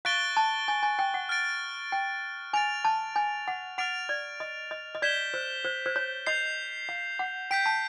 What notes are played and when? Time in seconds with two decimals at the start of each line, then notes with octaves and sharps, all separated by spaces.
0.05 F5 C#6 F#6 A6 D7 G7
0.37 A5
0.68 G#5
0.83 G#5
0.99 G5
1.14 F#5
1.29 F6 A6 D7
1.92 G5
2.53 G#5 A6 D7 F7
2.85 A5
3.16 G#5
3.48 F#5
3.78 F#5 F6 A6 D7 F7
4.09 D5
4.40 D#5
4.71 D#5
4.95 D#5
5.02 D5 G6 B6 E7 G7
5.34 C5
5.65 C5
5.86 C5
5.96 C#5
6.26 D#5 G6 C7 F7
6.89 F5
7.19 F#5
7.51 G5 G6 B6 D7
7.66 A5